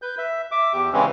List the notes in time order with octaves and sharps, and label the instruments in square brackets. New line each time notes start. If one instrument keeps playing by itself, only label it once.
[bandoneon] B4 G6
E5
E5 D6
E2 G4
C#3 E3 G#3 C4 C#4